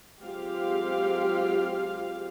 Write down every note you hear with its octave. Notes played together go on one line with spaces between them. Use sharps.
F#3 G#3 C4 F4 G4 F5